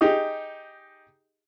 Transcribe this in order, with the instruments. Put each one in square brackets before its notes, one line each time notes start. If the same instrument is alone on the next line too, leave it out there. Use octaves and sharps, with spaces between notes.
[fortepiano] D#4 G4 G#4 D#5